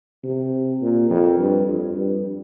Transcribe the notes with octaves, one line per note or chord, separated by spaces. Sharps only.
C3
A#2
F2
G2
F2
G2